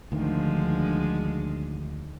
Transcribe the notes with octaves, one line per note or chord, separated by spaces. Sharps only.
D2 D3 D#3 F3 G#3